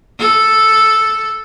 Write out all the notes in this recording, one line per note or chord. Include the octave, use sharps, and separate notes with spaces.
A4